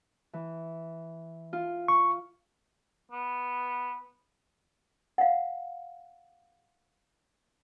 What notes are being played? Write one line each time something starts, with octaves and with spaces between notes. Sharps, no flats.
E3
F4
C#6
B3
F5 F#5